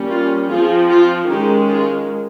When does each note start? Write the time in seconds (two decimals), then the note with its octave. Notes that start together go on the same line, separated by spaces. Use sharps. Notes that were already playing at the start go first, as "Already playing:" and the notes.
Already playing: G3 A#3 C#4
0.11 F4
0.50 F3 C4 F4 G#4
0.90 F4
1.29 D#3 G#3 C#4 D#4 G4
1.68 F4 G#4